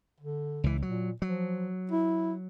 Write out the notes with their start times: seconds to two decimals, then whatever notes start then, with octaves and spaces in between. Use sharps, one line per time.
0.20 D3
0.64 C#2 E3
0.82 A#2 F#3
1.22 F3 F#3
1.92 E4